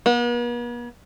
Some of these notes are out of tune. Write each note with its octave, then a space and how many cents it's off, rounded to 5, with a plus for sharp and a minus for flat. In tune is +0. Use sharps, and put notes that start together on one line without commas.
B3 -45